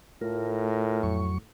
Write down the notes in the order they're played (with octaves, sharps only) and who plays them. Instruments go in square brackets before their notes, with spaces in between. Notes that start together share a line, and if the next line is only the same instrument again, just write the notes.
[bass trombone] A2 [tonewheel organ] A3 F4 A#4
[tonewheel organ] F2 F#3 C#6